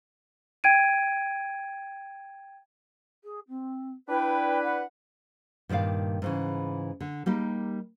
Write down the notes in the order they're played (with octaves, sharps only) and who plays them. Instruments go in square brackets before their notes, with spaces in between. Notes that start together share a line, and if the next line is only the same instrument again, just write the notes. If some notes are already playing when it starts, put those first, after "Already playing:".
[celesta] G5 G#6 D7 D#7
[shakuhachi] G#4
C4
[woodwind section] D4 E4 B4 [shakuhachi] G5
[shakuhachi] F#5
[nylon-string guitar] G2 A#2 D#3 D5 F5
G#2 C#3 E3
D3
G3 A#3 D#4 G4